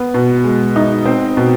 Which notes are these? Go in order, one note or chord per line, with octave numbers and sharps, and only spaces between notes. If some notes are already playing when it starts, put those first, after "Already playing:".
Already playing: B3
B2
G#3
D#4
C4
B2